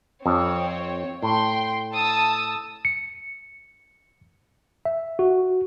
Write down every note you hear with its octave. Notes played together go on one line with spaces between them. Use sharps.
F2 C4 C#5
A2 G5 C6
A5 D#6 E6
C#7
E5
F#4